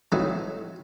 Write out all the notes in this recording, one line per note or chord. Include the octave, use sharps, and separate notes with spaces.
E3 F#3 A3 C4 D#4 E4